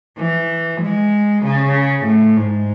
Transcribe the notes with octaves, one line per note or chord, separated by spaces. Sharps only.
E3
G#3
C#3
A2
G#2